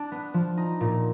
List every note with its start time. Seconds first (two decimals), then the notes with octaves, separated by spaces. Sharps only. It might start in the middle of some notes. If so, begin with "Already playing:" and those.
Already playing: D4
0.12 B3
0.34 F3
0.57 D#4
0.81 A#2